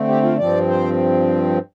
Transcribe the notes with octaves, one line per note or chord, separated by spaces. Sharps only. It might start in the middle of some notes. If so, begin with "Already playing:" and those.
Already playing: D3 A3 C4
G4
F4
G2 F3 C4 D5
C5